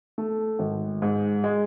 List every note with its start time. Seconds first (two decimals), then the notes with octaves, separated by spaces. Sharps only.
0.18 A3
0.59 G#1
1.02 G#2
1.44 G#3